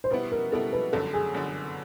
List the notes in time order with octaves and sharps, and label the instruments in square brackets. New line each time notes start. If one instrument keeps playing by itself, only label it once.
[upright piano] C5
[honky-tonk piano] B2 G3 B3 E4 [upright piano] B4
[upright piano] A#4
[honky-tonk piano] B2 G3 B3 E4 [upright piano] A4
[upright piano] B4
[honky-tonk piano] G1 F#2 D3 [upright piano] A4
[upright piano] G#4
[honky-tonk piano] G1 F#2 D3